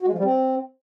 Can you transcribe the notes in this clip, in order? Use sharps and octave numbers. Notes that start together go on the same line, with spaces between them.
F#4
G#3
F3
G3
C4